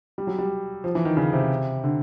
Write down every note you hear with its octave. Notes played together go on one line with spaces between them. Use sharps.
G3
F#3
G3
F3
E3
D#3
C#3
C3
D3